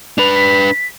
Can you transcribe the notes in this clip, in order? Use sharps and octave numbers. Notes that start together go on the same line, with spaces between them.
D4 B4 F7
B6